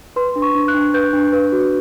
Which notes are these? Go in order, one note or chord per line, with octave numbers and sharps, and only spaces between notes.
B4 C6
D4
C#6
D4
F#6
D4
B4 G6
D4
B4
F#4